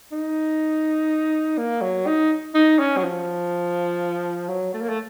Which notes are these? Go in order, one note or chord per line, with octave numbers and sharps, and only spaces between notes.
D#4
A#3
F#3
D#4
D#4
C#4
F#3
F3
F#3
A3
A#3
A3